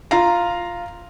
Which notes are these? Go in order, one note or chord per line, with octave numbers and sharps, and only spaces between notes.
F4 F5 A#5